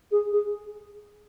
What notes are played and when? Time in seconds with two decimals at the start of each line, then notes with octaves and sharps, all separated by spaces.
0.11 G#4
0.32 G#4